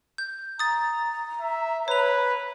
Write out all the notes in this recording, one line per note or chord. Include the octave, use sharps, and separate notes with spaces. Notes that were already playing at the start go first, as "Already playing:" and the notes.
G6
A#5 D#6 A6
E5
B4 C#5 F7